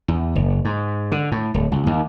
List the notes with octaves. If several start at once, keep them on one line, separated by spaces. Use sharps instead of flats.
E2
F#1
G#2
D3
A2
D1
C#2
D#2